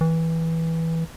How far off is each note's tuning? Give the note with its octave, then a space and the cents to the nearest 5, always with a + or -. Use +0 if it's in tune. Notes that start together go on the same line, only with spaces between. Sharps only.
E3 -10